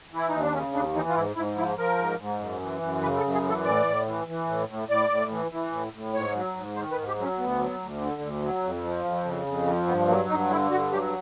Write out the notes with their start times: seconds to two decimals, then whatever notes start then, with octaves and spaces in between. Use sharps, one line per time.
0.12 E3 E4
0.28 D#2 D#4
0.41 D4
0.52 C#3 C#4
0.73 D#2 D4
0.94 E3 D#4
1.09 F4
1.15 G#2 E4
1.35 G#2 E4
1.56 F3 E4
1.77 F3 A#4
1.98 G#2
2.19 G#2
2.40 F#2
2.60 E3
2.82 F#2
3.02 C#3 B4
3.17 A4
3.23 F#2
3.34 G#4
3.43 E3
3.49 A4
3.64 A2 D5
3.86 A2
4.06 E3
4.27 E3
4.47 A2
4.69 A2
4.88 A2 D5
5.10 A2
5.31 E3
5.51 E3
5.72 A2
5.93 A2
6.13 G#2 C#5
6.34 F#3
6.56 G#2
6.76 D#3 C5
6.92 B4
6.97 G#2
7.08 G4
7.18 F#3 C#4
7.38 D2 B3
7.59 F#3
7.80 D2
8.01 D3
8.21 D2
8.42 F#3
8.64 F2
8.84 F3
9.04 F2
9.25 C#3
9.47 F2
9.67 F3
9.87 G2 B3
10.08 F#3 A#3
10.29 G2 D#4
10.50 D3 E4
10.71 G2 F#4
10.92 F#3 G4